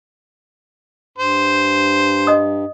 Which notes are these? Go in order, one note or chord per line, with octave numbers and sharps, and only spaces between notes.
G2 C5
D#5 D#6